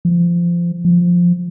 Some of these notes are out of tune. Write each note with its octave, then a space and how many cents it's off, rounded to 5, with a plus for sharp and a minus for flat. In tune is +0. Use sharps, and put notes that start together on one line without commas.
F3 -20
F3 +5